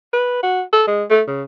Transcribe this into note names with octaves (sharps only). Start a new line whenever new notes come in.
B4
F#4
A4
G#3
A3
C#3